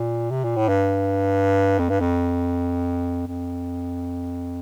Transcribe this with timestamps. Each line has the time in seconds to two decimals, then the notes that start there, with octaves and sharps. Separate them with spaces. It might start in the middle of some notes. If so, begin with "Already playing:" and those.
Already playing: A#2
0.31 C3
0.44 A#2
0.56 A2
0.68 G2
1.79 F2
1.89 G2
2.00 F2
3.28 F2